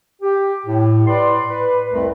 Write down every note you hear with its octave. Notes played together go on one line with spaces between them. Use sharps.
G4
A2
B4 D5 C6
B4
C2 F2 A3 C4 A#4 B4